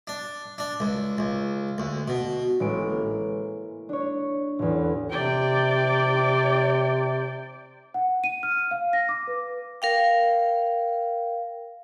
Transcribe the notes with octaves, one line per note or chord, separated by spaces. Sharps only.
D4
D4
C#2
C#2
D2
B2
A1 G#3 D7
A#3
D4 C#5
A1 E2
C3 D5 G5
F#5
D#7
F6
F5
A#6
D6
B4
A#4 F5 G5